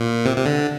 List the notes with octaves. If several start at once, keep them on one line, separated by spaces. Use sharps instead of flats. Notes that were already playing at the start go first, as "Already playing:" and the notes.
Already playing: A#2
C3
C3
D3